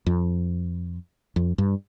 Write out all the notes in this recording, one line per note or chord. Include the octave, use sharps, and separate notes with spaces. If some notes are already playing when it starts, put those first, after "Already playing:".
F2
F2
G2